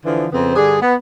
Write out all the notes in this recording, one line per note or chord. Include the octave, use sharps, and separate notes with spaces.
D3 E3 F3
F2 C#3 B3 C4
G2 D3 D4 G#4
B3